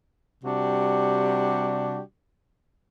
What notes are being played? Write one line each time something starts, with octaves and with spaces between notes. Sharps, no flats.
C3 G3 D4 F#4 G4